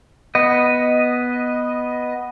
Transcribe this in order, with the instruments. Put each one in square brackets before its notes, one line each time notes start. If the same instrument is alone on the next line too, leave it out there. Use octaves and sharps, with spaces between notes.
[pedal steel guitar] B3 D#5